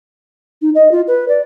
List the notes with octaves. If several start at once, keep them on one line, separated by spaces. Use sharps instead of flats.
D#4
D#5
F4
B4
D5